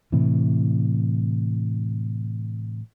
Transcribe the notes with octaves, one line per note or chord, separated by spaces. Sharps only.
A2 C3 E3